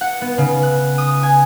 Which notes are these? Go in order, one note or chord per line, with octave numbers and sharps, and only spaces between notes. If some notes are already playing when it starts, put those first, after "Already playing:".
F#5
B3
C#3
F#6
D#6
G#5